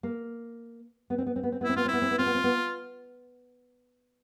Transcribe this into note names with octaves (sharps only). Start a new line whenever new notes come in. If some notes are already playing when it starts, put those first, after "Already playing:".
A#3
B3
C4
B3
C4
B3
C4
B3
E4
C4
B3 F4
C4
E4
B3
C4
B3
C4 F4
B3
C4
B3